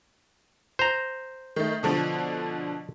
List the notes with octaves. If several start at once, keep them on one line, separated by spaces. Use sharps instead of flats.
C5 A#5
D#3 A3
B2 D3 F3